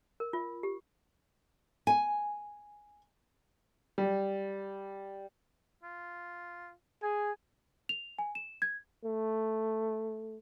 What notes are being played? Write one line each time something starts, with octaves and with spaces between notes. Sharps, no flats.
A#4
F4
G4
G#5
G3
F4
G#4 G#5
F7
G#5
E7
G#6
A3